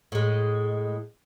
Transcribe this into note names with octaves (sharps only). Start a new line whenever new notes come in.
A2 G#3